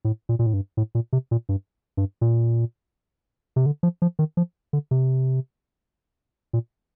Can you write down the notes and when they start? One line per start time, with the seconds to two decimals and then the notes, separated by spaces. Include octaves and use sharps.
0.05 A2
0.29 A#2
0.39 A#2
0.46 A2
0.53 G2
0.77 A2
0.95 A#2
1.13 C3
1.31 A#2
1.49 G2
1.97 G2
2.21 A#2
3.56 C3
3.66 D3
3.83 F3
4.02 F3
4.19 D#3
4.37 F3
4.73 D3
4.91 C3
6.53 A#2